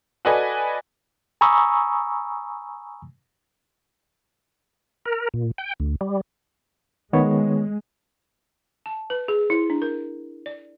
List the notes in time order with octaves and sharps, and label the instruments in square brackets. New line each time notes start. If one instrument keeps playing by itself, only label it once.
[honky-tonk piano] F#4 A4 B4 D5 D#5 G#5
[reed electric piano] G#5 A#5 B5 C#6 D#6 E6
[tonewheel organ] A#4
A#2
G5
D2
G3
[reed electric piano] D#3 B3 C#5 [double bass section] G#3
[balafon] A5
B4
G#4
E4
D4
A#4
D5